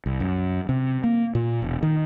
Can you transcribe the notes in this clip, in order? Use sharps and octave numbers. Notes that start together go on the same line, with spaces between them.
C2
F#2
C3
A#3
A#2
E1
D#3